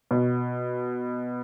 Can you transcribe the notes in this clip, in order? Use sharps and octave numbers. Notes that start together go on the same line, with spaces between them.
B2